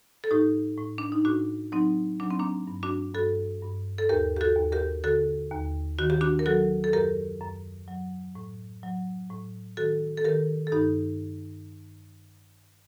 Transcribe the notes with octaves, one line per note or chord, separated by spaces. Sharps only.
A4
A2 D#4 G4
A2
D4
D#4
A2 D4 F#4
F#3 C4 D#4
F#3 D4
C4
A#3 D4
G2
D4 F#4
G2 F#4 A4
G2
A4
D#2 G4 A#4
G4
F#4 A4
D#2
G4 A#4
D3 F#4 A4
D#2
D#3 F#4
G4
D4 F#4
A#4
F#3 F#4 A4
A4
F#2 G4 A#4
F#2
F#3
A2
F#3
A2
D#3 F#4 A4
A4
D#3 G4 A#4
A4
G2 D#4 G4